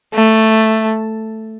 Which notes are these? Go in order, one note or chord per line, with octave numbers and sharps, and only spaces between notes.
A3